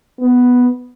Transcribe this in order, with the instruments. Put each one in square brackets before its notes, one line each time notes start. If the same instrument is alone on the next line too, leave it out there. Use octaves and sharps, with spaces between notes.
[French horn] B3